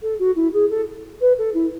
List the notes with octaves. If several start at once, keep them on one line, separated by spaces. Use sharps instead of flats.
A4
F#4
E4
G#4
A4
B4
A4
E4